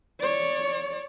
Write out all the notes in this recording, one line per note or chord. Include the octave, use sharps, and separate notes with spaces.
C#5 D5